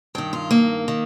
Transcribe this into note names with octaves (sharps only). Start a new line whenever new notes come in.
G2 D#3 G5
F4
A#3
D#3